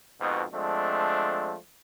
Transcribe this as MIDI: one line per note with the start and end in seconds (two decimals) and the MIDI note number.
0.20 0.43 41
0.20 0.43 44
0.20 0.43 47
0.53 1.55 53
0.53 1.55 56
0.53 1.55 57
0.53 1.55 60
0.53 1.55 62